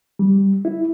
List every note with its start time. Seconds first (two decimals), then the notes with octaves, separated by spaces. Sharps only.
0.19 G3
0.65 E4